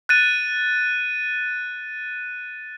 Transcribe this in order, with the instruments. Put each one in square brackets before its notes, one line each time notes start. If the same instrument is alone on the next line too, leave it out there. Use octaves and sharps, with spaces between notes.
[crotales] F#6 A6 D#7